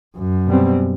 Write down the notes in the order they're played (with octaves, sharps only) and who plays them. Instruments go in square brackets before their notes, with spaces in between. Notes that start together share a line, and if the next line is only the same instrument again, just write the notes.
[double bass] F#2
[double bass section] B2 G3 C4